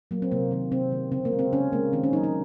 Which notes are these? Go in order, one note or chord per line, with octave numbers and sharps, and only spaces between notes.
F#3 A#3
C4
C3 A#3
D#3 A#3
C3 C4
D#3 A#3
C#3 C4
A#3
G#3
C4
C#3 C#4
G#3 A#3
D#3 C4
C#4
F#3 A#3 D#4
D#4